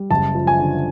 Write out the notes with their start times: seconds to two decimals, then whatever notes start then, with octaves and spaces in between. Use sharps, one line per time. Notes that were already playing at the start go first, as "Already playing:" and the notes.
Already playing: G3
0.11 F#1 A5
0.35 F3
0.47 G#5
0.59 D3